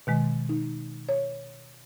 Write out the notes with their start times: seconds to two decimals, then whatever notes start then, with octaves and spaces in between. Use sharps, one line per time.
0.07 B2 D#3 G#3
0.49 D#4
1.09 C#5